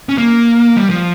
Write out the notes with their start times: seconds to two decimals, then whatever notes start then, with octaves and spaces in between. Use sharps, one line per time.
0.09 C#4
0.18 A#3
0.76 G3
0.90 F3